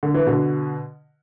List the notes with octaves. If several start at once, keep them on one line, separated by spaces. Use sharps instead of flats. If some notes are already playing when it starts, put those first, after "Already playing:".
D3
E3
B2 D3